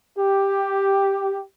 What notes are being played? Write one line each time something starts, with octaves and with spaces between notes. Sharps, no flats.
G4